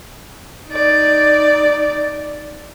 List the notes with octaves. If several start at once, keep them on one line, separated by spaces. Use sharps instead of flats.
D#4 D5